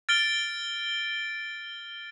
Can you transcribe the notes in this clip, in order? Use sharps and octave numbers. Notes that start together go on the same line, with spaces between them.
F6 A6 D7 G7